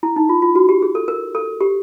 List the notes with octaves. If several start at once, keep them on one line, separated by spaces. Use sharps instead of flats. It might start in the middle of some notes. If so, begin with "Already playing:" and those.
E4
D#4
F4
F4
F#4
G4
G#4
A4
A#4
A4
G4